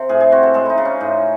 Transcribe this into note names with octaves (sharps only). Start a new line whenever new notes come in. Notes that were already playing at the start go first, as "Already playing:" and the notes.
Already playing: C3
A2 G#4
G#4
C4 F#4
A4
G#3 A4
D#4 E4
C#3
C#4
A2 D#4